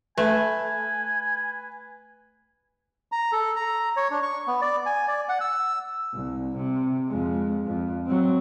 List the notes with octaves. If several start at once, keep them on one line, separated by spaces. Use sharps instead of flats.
A3 B4 G#5
A#5
A4
A#5
C#5
D4
C#6
B3
D5
G#5
D5
F#5
E6
C2
C3
F2 G#3
F2
F#3 C4